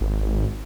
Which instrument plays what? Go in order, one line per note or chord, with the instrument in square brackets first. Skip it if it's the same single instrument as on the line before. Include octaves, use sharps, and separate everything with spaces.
[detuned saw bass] G#1